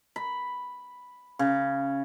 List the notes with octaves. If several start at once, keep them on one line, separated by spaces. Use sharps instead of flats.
B5
C#3